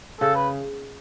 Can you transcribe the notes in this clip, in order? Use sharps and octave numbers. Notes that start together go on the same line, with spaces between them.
C#3 A4
B4